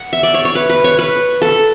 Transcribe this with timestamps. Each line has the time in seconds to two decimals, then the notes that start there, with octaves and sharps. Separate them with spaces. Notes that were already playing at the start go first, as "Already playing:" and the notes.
Already playing: F#5
0.13 E5
0.23 D5
0.34 C#5
0.45 C#5
0.55 B4
0.70 B4
0.84 C#5
0.99 B4
1.42 A4